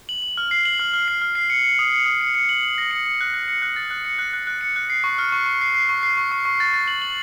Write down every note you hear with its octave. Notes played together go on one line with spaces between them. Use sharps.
F#7
F#7
F6
C7
F#7
F6
F6
C7
F6
C7
C#7
C#7
D#6
C#7
D#6
C#7
C#7
F#7
F#7
A#6
C#7
C#7
F#6
F#6
C#7
F#6
A6
F#6
C#7
F#6
F#6
F#6
C#7
F#6
C7
C#6
F6
C#6
C#6
C7
C7
C#6
C7
C#6
C#6
C#6
A6
A6
F#7
F#7